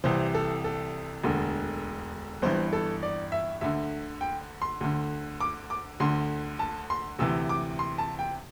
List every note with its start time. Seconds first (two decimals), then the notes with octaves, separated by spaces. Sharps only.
0.04 C2 C3 E3 C5
0.35 A4
0.64 A4
1.23 E1 D2 D3
2.42 G1 G2 E3 C5
2.73 A4
3.03 D5
3.32 E5
3.61 D2 D3 E5
4.21 G5
4.62 C6
4.81 D2 D3
5.40 D6
5.70 D6
6.00 D2 D3 C6
6.59 A5
6.90 C6
7.19 D2 C3 E3 E6
7.49 D6
7.79 C6
7.98 A5
8.19 G5